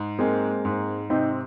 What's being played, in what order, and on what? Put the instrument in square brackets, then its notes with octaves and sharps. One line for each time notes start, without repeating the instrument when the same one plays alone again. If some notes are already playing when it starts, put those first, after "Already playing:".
Already playing: [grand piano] G#2
[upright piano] G#3 C4 [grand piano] A#3
[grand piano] G#2
[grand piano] C3 [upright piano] C4 D#4